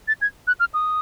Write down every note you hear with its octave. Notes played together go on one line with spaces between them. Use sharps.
A6
G#6
F#6
F6
D#6